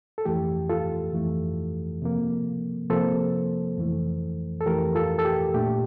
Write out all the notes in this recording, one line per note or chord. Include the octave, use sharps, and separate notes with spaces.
A4
F2 E3 A3 G4
F4 A4
F2 E3 A3
C3 F3 A#3
C3 F3 A#3 A4 C5
F2 E3 A3
A4
F2 E3 A3 G4 A#4
F4 A4
A4
G4
A#2 A3 D4 G4